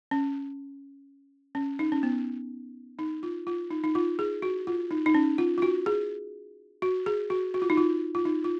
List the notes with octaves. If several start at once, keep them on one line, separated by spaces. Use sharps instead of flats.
C#4
C#4
D#4
C#4
B3
D#4
F4
F4
D#4
D#4
F4
G#4
F#4
F4
D#4
D#4
C#4
F4
F4
F#4
G#4
F#4
G#4
F#4
F#4
F4
D#4
F4
F4
D#4
F4